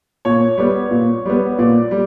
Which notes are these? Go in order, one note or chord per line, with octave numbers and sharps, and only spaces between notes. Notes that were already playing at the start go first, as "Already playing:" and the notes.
A#2 C#5
G3 B3
A#2
G3 B3
A#2 D5
G3